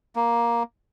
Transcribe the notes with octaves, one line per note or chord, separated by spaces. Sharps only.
A#3